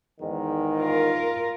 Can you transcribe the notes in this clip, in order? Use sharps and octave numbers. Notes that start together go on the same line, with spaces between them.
E2 G#2 D#3
F4 A#4